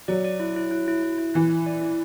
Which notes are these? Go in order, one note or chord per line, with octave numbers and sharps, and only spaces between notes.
F#3 D5
D5
E4
E4
E4
E4
E4
E4
E3 E4
E4
D5
E4